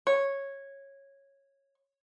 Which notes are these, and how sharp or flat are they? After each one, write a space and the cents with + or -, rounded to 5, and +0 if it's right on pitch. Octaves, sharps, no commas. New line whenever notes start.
C#5 -10